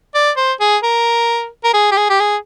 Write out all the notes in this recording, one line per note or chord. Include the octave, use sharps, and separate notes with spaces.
D5
C5
G#4
A#4
A#4
G#4
G4
G#4
G4
G#4